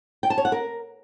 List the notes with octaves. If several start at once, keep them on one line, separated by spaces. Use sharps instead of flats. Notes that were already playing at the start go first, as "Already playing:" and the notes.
G5
A5
C#5
F#5
A#4